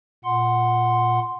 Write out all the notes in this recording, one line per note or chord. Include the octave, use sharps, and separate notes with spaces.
A#2 F#5 C6